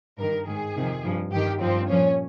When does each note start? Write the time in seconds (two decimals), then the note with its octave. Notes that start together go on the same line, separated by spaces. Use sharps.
0.18 G2 D#3 A#4
0.47 G#2 D#3 G#4
0.75 F2 C3 D#3
1.03 G2 F3
1.31 G2 D#3 G4
1.60 G2 F3 C4
1.88 A#2 F3 C#4